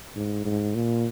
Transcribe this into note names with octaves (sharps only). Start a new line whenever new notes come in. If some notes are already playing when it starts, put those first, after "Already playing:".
G#2
G#2
A#2